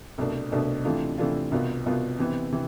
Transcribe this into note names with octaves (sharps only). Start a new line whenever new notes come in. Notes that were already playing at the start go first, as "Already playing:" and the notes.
C2 B2 A3 D4
C2 B2 A3 D4
C3 E3 A3 D4 F4
C3 E3 A3 D4 F4
C2 B2 B3 F4
C2 B2 B3 F4
C3 E3 B3
C3 E3